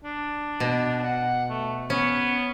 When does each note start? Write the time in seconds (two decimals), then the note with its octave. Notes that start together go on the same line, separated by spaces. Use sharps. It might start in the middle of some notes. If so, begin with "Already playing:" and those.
0.04 D4
0.60 B2
1.04 F#5
1.50 A3
1.90 B3 C#4